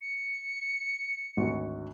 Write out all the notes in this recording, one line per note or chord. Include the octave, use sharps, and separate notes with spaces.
C#7
G#1 D2 F#4